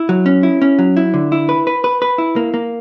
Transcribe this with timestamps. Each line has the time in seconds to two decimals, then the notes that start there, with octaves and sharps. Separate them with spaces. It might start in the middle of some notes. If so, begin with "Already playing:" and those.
Already playing: E4
0.09 F#3
0.26 C#4
0.43 E4
0.62 C#4
0.79 F#3
0.97 E4
1.14 D3
1.32 E4
1.49 B4
1.67 B4
1.84 B4
2.02 B4
2.18 E4
2.36 A#3
2.54 A#3